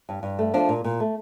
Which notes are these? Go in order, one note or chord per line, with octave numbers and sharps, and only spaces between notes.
G2
G2
A3
F3 D4
A#2
A#2
A3